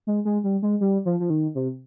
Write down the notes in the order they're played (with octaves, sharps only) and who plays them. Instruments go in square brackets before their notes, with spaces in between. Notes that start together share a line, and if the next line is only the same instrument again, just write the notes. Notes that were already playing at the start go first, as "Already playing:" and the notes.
[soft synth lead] G#3
G#3
G3
G#3
G3
F3
F3
D#3
C3